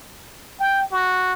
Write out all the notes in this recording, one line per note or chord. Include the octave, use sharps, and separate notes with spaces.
G5
F#4